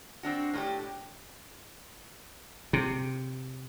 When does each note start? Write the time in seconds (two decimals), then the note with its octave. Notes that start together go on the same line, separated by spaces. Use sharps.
0.23 C4 D4 F#4
0.53 A2 D4 G4
2.73 C3